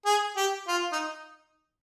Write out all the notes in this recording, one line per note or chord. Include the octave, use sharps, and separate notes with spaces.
G#4
G4
F4
D#4